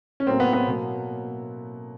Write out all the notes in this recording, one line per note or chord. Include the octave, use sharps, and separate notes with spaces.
C#4
A2 F#3 A#3 C4
B3
B3
B2 F#3 A#3